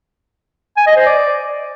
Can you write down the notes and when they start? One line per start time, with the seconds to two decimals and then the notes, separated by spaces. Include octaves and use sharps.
0.77 G#5
0.87 D#5
0.97 C5
1.06 D5